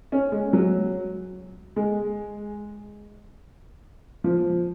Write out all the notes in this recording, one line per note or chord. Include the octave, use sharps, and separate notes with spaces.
C#4
G#3
F#3
G#3
F3